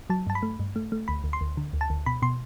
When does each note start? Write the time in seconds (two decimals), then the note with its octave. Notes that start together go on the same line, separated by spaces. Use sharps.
0.10 F#3 A5
0.27 G2 A5
0.35 B5
0.43 A3
0.60 G2
0.76 A3
0.92 A3
1.08 D2 B5
1.24 D2
1.33 C6
1.41 D2
1.57 D3
1.73 D2
1.81 A5
1.90 D2
2.06 B2 B5
2.22 B2 C6